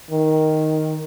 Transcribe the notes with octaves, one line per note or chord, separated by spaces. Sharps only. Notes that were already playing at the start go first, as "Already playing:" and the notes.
D#3